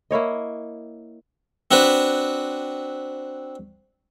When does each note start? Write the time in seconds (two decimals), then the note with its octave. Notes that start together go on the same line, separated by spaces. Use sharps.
0.11 A#3 E4 C#5 D#5
1.71 C4 D4 F#4 B4